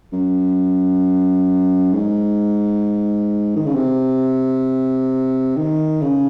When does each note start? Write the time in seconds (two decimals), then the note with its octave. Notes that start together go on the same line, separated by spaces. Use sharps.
0.12 F#2
1.93 G#2
3.56 D#3
3.66 C#3
3.75 C3
5.57 D#3
6.02 C#3